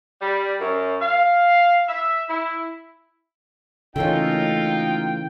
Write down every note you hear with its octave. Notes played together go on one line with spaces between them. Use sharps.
G3
F#2
F5
E5
E4
C#3 E3 A3 A#3 C#4 D#4 F4 G5